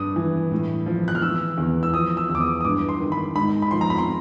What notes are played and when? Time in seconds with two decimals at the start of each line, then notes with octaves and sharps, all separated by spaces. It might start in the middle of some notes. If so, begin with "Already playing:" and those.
Already playing: G2 D#6
0.16 E3
0.51 A2
0.86 F3
1.08 F#6
1.15 F6
1.22 E3 E6
1.58 E2
1.83 E6
1.93 F3 D#6
2.17 E6
2.30 E2
2.35 D6
2.40 D#6
2.61 D#6
2.65 G2 D6
2.89 C6
3.00 D#3
3.12 B5
3.35 G#2 B5
3.62 B5
3.71 F3 C6
3.81 A#5
3.90 B5
3.98 C6